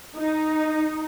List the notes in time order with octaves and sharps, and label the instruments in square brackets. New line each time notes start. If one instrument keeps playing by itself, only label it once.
[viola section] D#4